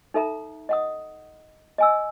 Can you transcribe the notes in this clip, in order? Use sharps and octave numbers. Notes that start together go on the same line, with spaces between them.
D#4 A4 E5 A#5
D#5 F#5 D#6
D#5 G#5 E6